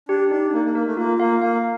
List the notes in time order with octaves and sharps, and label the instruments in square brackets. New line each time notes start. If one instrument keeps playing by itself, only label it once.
[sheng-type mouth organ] D4 [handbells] G4
[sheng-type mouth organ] D4 [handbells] D#4
[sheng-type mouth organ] A#3 [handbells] D#4
[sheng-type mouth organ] A#3
[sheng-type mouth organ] A#3 [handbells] A#4
[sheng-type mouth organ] A3
[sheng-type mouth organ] A#3 [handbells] F4
[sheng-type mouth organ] A#3 [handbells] F5
[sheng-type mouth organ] A#3 [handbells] F5